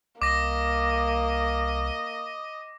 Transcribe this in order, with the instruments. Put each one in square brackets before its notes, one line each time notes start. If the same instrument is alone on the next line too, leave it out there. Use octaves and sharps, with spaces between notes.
[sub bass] C2 [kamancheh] A#3 [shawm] D#5 [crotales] D6 A#6